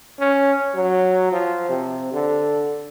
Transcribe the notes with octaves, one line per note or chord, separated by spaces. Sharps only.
C#4
F#3
F3
C3
D3